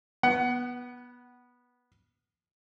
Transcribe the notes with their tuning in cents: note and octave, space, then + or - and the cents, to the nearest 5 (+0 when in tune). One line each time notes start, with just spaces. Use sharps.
B3 -15 F#5 +20